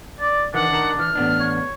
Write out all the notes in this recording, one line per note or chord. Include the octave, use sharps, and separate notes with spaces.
D5
D#3 E3 D4 F#5
D#3 A5 A#5
E3 F6
A1 B3 D4
C#5